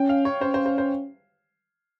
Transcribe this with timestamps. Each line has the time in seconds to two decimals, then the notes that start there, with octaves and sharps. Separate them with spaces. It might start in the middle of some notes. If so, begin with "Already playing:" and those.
Already playing: C#4 G5
0.09 F5
0.25 C#5
0.41 C#4 C5
0.54 C5
0.66 C5
0.78 C5